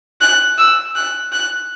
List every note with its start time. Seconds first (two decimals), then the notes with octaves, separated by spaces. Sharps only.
0.21 F#6
0.58 E6
0.96 F#6
1.32 F#6